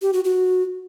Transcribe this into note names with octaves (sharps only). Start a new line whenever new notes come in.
G4
F#4
F#4